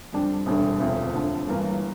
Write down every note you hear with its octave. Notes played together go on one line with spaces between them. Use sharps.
F2 D3 G3 D4
E1 D2 D3 G3
E1 D2 C3 F3 C4
F2 D3 A3
G1 G2 E3 A#3